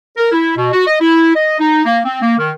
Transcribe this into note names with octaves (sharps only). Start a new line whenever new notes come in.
A#4
E4
B2
F#4
D#5
E4
D#5
D#4
A#3
C4
A#3
D#3